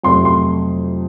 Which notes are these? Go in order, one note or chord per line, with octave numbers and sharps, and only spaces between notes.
F2 C3 F#3 A3 C6
C6